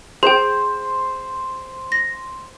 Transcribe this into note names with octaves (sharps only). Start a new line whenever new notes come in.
G#4 C5 G5
A#6